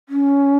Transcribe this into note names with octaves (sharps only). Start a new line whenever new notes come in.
C#4